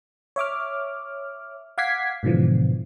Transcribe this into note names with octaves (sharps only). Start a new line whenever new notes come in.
C#5 E5 D6 F6
F5 F#5 D6 G#6 B6 C7
G#2 B2 D3 E3 F3